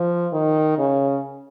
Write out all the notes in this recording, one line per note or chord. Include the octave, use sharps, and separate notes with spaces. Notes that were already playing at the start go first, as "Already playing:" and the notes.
Already playing: F3
D#3
C#3